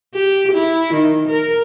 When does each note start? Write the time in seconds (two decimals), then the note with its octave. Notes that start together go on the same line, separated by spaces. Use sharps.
0.14 G4
0.52 E4
0.94 D#3
1.28 A#4